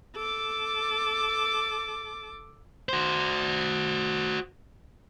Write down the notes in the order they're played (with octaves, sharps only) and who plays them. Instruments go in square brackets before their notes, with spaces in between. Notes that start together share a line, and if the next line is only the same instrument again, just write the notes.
[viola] A4 D6
[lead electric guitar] F#4 C5